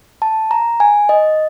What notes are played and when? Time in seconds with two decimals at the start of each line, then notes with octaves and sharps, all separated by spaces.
0.22 A5
0.51 A#5
0.80 G#5
1.09 D#5